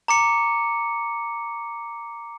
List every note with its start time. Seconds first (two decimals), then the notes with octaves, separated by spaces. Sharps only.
0.08 A#5 D6 C#7